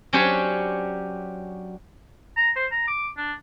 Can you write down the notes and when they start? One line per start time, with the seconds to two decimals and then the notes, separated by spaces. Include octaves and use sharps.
0.13 F#3 C#4 D4 G4 C5 C#5
2.37 A#5
2.56 C5
2.72 A#5
2.88 D6
3.17 D4